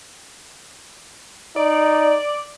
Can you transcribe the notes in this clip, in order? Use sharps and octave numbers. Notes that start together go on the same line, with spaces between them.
D#4 D5